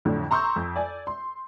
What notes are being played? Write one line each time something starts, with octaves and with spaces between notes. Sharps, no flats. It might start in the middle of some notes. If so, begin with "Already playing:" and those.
F2 A2 D3 F#3
A#5 C6 C#6 E6 G6
F2
D5 G#5
C6